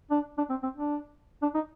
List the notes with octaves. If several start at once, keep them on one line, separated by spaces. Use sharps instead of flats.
D4
D4
C4
C4
D4
D4
D#4